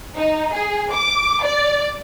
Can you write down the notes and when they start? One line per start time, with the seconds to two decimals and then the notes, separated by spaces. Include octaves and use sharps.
0.17 D#4
0.54 G#4
0.91 D6
1.43 D5